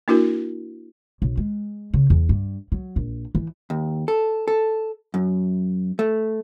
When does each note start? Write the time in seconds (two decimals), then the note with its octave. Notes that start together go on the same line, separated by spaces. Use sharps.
0.08 A#3 D4 E4 F#4 A#4
1.22 B1
1.37 G#3
1.94 C#3
2.10 E2
2.29 G2
2.72 F#3
2.96 A#1
3.35 E3
3.70 D#2
4.08 A4
4.48 A4
5.14 F#2
5.99 A3